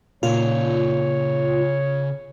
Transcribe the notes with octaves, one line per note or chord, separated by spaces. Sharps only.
A#2 C#3 F4 C#5 D5